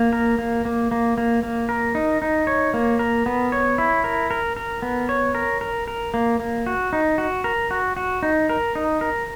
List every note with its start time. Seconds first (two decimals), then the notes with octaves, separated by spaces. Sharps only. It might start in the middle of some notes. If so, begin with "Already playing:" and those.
Already playing: A#3
0.13 A#4
0.39 A#3
0.65 A#3
0.91 A#3
1.18 A#3
1.43 A#3
1.69 A#4
1.95 D#4
2.22 D#4
2.47 C#5
2.74 A#3
2.99 A#4
3.26 B3
3.52 C#5
3.78 E4
4.04 A#4
4.31 A#4
4.56 A#4
4.82 B3
5.09 C#5
5.35 A#4
5.61 A#4
5.88 A#4
6.14 A#3
6.40 A#3
6.66 F#4
6.93 D#4
7.18 F#4
7.44 A#4
7.71 F#4
7.96 F#4
8.23 D#4
8.49 A#4
8.75 D#4
9.01 A#4